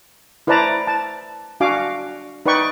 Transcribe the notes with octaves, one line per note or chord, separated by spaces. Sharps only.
E4 B4 C5 D5 A5 A#5
A5
D4 F#4 F5 G#5 D6
D#4 B4 D5 G5 C#6